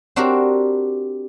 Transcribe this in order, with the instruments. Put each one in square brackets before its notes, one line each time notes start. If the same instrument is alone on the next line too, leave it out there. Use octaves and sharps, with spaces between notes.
[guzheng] C4 D4 F#4 G4 A#4